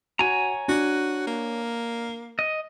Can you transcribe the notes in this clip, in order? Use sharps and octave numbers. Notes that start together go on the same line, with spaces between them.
F#4 C#5 G#5 A#5
D4 F#4
A#3
D#5